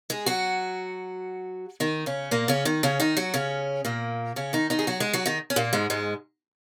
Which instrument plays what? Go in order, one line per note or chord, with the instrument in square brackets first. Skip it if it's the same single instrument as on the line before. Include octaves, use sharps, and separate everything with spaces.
[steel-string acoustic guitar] G#3 G#4
F#3 F#4
D#3 D#4
C#3 C#4
A#2 A#3
C#3 C#4
D#3 D#4
C#3 C#4
D#3 D#4
F#3 F#4
C#3 C#4
A#2 A#3
C#3 C#4
D#3 D#4
D#3 D#4
G#4
F#3 F#4
G#3 G#4
F#3 F#4
D#3 D#4
C#4
A#2 A#3
G#2 G#3
G#2 G#3